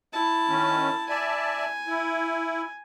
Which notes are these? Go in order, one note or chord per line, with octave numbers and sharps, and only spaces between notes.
E4 A5
D#3 C#4
D5 E5 G#5 A5
E4